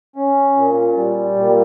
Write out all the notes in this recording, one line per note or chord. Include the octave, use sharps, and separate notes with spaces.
C#4
A#2
G3
A#2